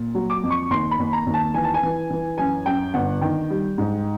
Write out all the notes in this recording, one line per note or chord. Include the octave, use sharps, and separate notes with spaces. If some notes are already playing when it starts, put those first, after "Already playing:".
Already playing: A#2
F#3
D6
F2
C#6
D#2 C6
B5
D#2
A#5
D#2
A5
E3 G#5
A5
G#5
E3
E3
F#2 G#5
F#2 G5
G1 F#5
D#3 G5
G3
G#2